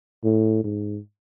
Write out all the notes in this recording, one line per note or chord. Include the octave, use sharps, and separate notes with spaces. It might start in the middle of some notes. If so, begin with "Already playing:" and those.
A2
G#2